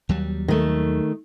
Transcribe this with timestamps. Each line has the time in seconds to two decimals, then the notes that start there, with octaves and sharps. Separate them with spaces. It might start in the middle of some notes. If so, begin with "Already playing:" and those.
0.09 D#2 F#3 G3
0.48 D#3 A3